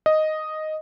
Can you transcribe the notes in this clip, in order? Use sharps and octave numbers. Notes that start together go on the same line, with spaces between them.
D#5